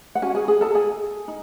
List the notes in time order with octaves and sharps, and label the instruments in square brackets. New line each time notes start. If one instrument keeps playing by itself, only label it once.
[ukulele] F#5
C#4 F#4 G#5
G#4 G#5
G#4 G#5
A4 A5
G#4 G#5
D#4